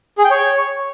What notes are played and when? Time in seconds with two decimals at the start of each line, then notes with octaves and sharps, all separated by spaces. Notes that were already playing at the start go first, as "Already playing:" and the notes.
0.18 G#4
0.24 G5
0.31 C#5